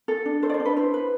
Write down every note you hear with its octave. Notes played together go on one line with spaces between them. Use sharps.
A4
D4
A4 C5
D5
C5
D4
B4
E4 C5
B4